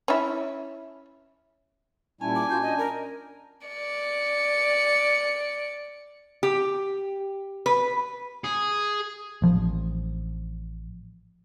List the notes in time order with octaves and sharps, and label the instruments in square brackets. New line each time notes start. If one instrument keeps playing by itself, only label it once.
[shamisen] C#4 E4
[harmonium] A#2 G3 E4 [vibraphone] C#4 A5 [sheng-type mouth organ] G#5
[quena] D6
[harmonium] F4 F#4 [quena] G6
[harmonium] D4 [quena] D#5
[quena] A#4
[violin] D5 C#7
[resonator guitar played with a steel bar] G4
B4
[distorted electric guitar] G#4
[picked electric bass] A1 F3